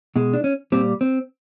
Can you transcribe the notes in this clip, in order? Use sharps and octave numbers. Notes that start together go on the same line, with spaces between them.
B2 G#3
D4
C#4
A#2 G3 C4
C4